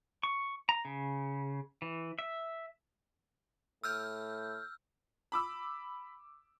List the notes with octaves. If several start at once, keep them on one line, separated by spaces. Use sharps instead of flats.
C#6
A#5
C#3
E3
E5
A2 E6 F6 G6
B5 D6 E6